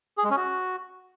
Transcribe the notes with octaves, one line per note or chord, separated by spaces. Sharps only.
G#4
G#3
C#4
F#4